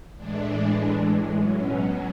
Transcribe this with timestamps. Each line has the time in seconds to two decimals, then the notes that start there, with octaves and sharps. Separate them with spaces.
0.16 A2 E3 G#3 D4
1.35 B2 F#3 C#4